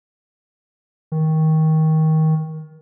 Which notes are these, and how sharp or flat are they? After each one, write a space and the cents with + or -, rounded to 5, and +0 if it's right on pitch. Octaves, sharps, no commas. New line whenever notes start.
D#3 +20